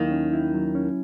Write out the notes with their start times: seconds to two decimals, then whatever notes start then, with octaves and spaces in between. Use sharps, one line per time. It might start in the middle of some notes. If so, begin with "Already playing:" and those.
Already playing: D#2 D#3 F#3 E4
0.11 C#4
0.33 E4
0.54 F#3
0.75 C#4